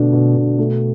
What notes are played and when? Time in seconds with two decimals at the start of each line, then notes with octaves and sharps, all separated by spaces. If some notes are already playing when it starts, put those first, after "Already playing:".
Already playing: B2 D3 A3 D4
0.13 B2
0.36 B2
0.58 A3